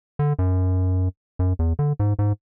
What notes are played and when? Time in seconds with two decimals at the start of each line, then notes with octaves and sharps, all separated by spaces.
0.19 D3
0.39 F#2
1.39 F#2
1.59 E2
1.79 D3
2.00 G#2
2.19 G#2